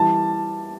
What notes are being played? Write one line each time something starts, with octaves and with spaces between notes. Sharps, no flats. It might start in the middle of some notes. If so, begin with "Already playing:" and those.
Already playing: E3 G3 A5